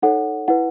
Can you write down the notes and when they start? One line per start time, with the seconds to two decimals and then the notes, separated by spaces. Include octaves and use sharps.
0.02 D#4 A4 C#5 F#5
0.48 E4 B4 F#5